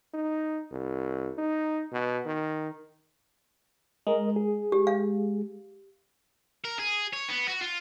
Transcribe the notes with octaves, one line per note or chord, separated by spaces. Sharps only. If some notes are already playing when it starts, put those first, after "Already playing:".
D#4
C2
D#4
B2
D#3
G#3 A#4 D#5
G#4
G4
F5
A#4
G#4
C#5
B3
F#4
F4